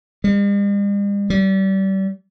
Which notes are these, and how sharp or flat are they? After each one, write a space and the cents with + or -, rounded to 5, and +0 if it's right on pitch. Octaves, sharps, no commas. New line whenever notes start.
G3 +45
G3 -30